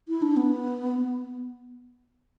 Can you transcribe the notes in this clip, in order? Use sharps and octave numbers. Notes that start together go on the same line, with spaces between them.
E4
D4
B3